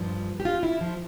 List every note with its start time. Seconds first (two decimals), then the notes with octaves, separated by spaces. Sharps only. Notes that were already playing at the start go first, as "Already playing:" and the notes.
Already playing: G2 F3
0.40 G4
0.45 F4
0.63 E4
0.81 F3